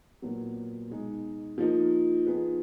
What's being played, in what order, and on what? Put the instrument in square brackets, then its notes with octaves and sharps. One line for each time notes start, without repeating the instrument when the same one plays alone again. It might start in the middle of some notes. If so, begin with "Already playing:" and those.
[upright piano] A#2 F#3 B3
B2 G#3 D#4
F3 A#3 D#4
F3 B3 D#4 G#4 B4